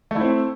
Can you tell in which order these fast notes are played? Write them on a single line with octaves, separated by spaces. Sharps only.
A3 E4 C4